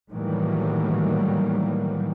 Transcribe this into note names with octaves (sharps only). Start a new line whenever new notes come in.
A2 D#3 E3 F#3 G3 A#3